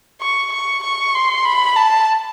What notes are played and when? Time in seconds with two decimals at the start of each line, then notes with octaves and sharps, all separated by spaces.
0.21 C#6
0.52 C#6
0.83 C#6
1.15 C6
1.45 B5
1.76 A5